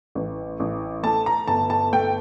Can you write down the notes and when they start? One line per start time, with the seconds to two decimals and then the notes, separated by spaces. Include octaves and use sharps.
0.15 A1
0.60 A1
1.03 A3 A5
1.26 A#5
1.48 G1 A5
1.70 A5
1.93 A3 G5